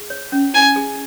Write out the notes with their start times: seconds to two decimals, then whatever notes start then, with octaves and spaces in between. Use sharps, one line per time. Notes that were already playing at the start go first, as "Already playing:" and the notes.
Already playing: G#4
0.10 C#5
0.32 C#4
0.54 E4 G#5
0.76 G#4